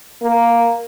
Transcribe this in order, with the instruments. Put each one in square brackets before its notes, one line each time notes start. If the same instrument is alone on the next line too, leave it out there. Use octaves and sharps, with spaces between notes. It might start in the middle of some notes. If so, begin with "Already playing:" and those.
[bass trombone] A#3